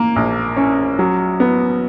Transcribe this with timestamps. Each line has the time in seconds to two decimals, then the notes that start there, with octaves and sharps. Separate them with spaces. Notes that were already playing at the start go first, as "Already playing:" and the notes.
Already playing: A#3
0.16 A#1
0.56 C#4
0.99 F#3
1.40 B3